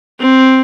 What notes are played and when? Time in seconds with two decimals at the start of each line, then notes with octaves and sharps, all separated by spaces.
0.20 C4